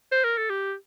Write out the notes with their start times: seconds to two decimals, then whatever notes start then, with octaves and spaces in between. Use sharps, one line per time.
0.12 C5
0.24 A#4
0.38 A4
0.50 G4